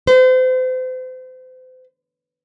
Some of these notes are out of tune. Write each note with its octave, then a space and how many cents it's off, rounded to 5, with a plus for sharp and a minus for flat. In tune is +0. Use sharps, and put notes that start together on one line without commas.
C5 -35